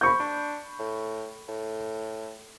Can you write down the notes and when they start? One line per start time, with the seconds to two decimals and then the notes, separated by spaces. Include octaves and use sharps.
0.01 A#3 B5 C#6 G6
0.20 D4
0.79 A2
1.48 A2